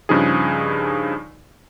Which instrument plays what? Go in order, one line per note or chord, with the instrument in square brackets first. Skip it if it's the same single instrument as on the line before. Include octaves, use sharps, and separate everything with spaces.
[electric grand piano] G2 C#3 F3 D#4 G#4